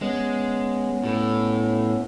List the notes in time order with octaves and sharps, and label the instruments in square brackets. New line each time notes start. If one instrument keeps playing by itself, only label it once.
[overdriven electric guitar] G#3 [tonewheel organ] B3 C#4
[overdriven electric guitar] A2